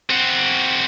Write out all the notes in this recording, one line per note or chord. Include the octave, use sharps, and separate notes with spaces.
C4 F#4